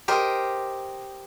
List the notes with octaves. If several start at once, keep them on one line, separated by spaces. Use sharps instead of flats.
G4 A#4 C5 D#5